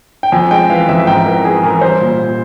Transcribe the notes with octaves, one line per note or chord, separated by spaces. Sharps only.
G5
F2 G#5
G#3 G5
E3 F5
F2 E5
G#2 G5
E3 A#4
E3 G#4
E3 A#4
G3 C5
A#2
A#2